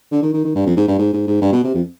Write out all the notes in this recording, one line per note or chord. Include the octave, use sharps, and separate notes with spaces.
D3
D#3
D#3
D#3
G2
F2
G#2
G2
G#2
G#2
G#2
G2
B2
C3
F2